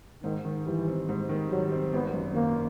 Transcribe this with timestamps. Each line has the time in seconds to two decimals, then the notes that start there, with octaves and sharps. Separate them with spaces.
0.23 G#2 D#3
0.45 D#3
0.66 E3 G3
0.88 C4
1.09 G#2
1.29 D#3
1.51 F#3 G3
1.72 C4
1.93 G#1 B3
2.14 F#2
2.35 D#3 A#3